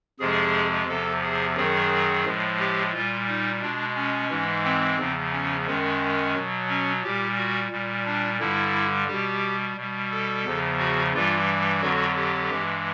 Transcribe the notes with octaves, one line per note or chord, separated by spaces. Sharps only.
F2 C3 F3 G#3 G#4
E2 C3 F3 A4
G#4
F#2 D#3 F#3 G#4
A2 F3 G#3
G4
A#2 G3 F4
D#4
B2 G#3 D4
C#4
G#2 E3 G#3
C4
E2 C#3 F3
C#4
F#2 D#3 G#3 C#4
B2 F#3
C#4
A#2 G3 G4
F#4
A#2 G3
D4
G2 D3 G3 E4
B2 G3 G4
B2 G3
A4
E2 C#3 F3
F#4
G2 E3 G3 F4
F2 D3 F#3 F#4
G4
G2 E3 G#3